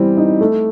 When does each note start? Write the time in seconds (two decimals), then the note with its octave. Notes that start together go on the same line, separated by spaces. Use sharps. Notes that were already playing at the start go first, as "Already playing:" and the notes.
Already playing: E3 G3 C4
0.17 D#4
0.41 A3